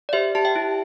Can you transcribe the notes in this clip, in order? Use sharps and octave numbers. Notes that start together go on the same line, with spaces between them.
D5
G4 C5 E5
G4 A5
E5 G5
E4